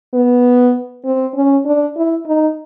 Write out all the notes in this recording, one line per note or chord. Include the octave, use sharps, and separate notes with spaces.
B3
C4
C#4
D4
E4
D#4